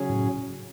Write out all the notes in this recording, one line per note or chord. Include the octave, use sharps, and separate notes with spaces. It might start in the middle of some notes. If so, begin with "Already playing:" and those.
Already playing: C#3 F#3 C#4 G#4
A2